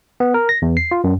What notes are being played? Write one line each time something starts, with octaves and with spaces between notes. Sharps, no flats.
B3
A#4
A#6
E2
C7
F4
F#2